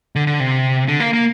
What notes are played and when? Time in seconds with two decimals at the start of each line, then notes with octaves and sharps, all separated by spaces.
0.15 D3
0.27 D3
0.40 C3
0.88 D3
1.00 A#3
1.13 A#3